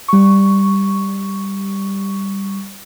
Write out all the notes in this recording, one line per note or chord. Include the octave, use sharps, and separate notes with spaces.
G3 C#6